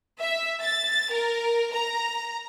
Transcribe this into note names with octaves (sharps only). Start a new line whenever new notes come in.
E5
A6
A#4
A#5